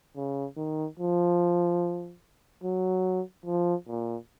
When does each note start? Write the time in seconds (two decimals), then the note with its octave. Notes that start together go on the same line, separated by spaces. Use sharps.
0.17 C#3
0.57 D#3
0.99 F3
2.63 F#3
3.46 F3
3.87 A#2